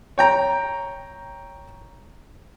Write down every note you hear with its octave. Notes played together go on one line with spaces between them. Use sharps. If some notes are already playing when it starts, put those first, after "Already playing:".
C#5 G5 A#5